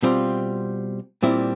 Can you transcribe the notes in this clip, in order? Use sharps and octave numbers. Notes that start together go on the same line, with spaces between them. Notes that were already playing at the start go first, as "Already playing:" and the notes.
B2 G3 C4 F4
A#2 G3 C4 E4